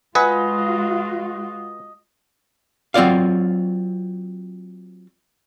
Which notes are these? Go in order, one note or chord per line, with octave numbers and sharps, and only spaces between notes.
G#3 F4 F#4 B4 D#5 F#5 G#5
F#3 C4 F4 D5 F5